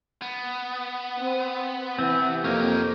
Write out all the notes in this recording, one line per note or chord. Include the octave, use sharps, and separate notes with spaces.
B3
C4
C3 E3 C4
F2 A#3 D#4 C#5